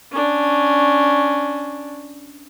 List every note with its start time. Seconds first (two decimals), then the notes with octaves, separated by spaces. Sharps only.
0.11 C#4 D4